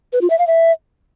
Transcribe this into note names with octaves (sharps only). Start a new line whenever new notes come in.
B4
F4
E5
F5
E5